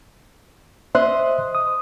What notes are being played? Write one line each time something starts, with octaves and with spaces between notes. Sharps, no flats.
C5 D#5 E5 C6 F#6
D#6